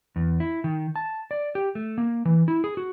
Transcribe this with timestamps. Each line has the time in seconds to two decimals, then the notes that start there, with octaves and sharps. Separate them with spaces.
0.16 E2
0.40 E4
0.64 D#3
0.96 A5
1.31 D5
1.55 G4
1.75 A3
1.98 A#3
2.25 E3
2.48 E4
2.64 G#4
2.77 F#4